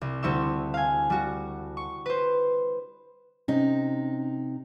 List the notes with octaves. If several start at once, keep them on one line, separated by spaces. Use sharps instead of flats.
C2
D2 G3 C4 E4 C#6 E6
F5 G#5
G3 F#4
C#6
B4 C5
C3 C#4 D#4